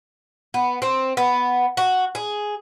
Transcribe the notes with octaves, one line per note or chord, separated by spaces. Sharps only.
B3
C4
B3
F#4
G#4